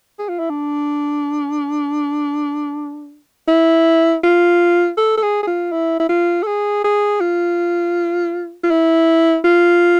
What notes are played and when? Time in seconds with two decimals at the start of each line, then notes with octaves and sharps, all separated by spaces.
0.19 G#4
0.29 F4
0.39 E4
0.50 D4
3.48 E4
4.23 F4
4.97 A4
5.17 A4
5.22 G#4
5.43 G#4
5.47 F4
5.72 E4
6.00 E4
6.09 F4
6.43 A4
6.47 G#4
6.84 G#4
7.21 F4
8.63 F4
8.71 E4
9.45 F4